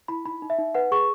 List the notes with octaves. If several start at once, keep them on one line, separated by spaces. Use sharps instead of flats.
E4 B5
D#4 B5
D#4
E5
D#4
B4 F#5
G#4 C#6